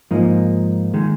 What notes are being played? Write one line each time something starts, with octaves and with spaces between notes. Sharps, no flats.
G#2 F3 A#3 D#4
D#3 G#3